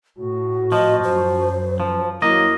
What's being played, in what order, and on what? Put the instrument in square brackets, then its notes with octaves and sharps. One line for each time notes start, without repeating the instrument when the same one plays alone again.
[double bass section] A2 [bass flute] F#4
[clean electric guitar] F3 [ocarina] D#5
[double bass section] F#2 [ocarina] C5
[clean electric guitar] F3
[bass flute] F#3 [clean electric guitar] A#3 D#5 [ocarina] E4